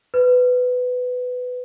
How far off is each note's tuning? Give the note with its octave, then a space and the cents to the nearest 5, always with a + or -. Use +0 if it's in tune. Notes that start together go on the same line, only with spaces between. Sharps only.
B4 +15